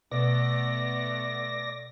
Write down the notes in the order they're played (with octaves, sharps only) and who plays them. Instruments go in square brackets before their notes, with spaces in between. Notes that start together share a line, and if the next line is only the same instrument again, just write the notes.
[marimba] B2 [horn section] A3 B3 [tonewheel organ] D5 A#6